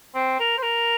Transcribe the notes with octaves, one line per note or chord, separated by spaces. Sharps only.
C4
A#4
C5
A#4